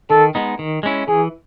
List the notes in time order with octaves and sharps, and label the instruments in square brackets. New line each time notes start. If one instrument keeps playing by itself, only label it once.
[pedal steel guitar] D#3 [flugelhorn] A4
[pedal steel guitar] G#3 B3 D#4
D#3
G#3 C#4 E4
[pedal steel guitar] E3 [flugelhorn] G#4